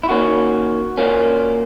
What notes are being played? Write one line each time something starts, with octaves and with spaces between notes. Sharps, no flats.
E4
D#3 A#3 C#4 F#4
A#2 A#3 C#4